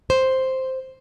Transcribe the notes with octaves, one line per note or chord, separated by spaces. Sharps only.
C5